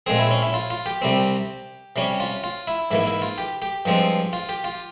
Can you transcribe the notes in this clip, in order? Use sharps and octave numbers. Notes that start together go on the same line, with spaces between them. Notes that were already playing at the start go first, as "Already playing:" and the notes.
A#2 G#3 C4 G#4
E4
C#4
E4
F4
F4
G4
C2 C3 G3 C4
C3 G3 C#4
F4
F4
E4
G#2 E3 A#3 E4
E4
F4
G4
G4
G2 F3 G#3 C4
F4
G4
F4